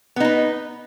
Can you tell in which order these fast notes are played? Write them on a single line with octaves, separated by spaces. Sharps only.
B3 D#4 B4